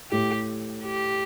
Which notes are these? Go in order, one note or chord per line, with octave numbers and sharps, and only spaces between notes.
A2 G4
G4